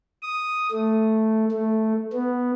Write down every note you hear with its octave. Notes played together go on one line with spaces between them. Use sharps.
D#6
A3
A3
B3